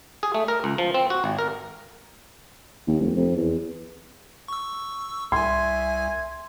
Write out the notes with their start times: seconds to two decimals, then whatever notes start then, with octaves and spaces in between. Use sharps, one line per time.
0.23 G#4
0.34 A3
0.48 A#4
0.64 C#2
0.78 F3
0.94 C4
1.10 F#4
1.24 G#1
1.39 A#4
2.87 D#2
3.00 F1
3.16 F2
3.36 E2
4.48 C#6 E6
5.32 C2 E5 G#5 C6 G#6